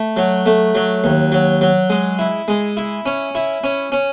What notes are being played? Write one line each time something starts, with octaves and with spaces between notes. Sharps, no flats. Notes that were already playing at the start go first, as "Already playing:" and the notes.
Already playing: A3
F#3
A3
F#3
D#2
F#3
F#3
G#3
E4
G#3
E4
C#4
E4
C#4
C#4